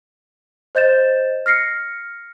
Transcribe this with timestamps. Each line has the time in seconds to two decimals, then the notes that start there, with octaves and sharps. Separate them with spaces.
0.75 C5 D#5 G6 A6 E7
1.46 F6 A#6 C7 C#7